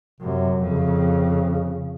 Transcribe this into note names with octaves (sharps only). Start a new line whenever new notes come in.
F#2 C3
F2 C#3